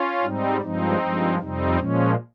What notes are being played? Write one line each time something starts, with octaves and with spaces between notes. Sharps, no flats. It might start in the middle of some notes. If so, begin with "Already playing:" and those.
Already playing: C#4 F4
G#2 G3 C4 D#4
G2 F3 G#3 C4 D#4
G2 F3 G#3
F2 C3 G3 C4 D#4
A#2 F3 G#3 C#4